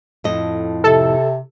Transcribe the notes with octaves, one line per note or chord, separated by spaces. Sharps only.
F2 A2 D#5
C3 A4